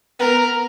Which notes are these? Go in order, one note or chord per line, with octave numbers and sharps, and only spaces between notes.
B3 A#4